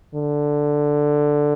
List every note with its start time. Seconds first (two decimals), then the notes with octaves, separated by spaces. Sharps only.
0.15 D3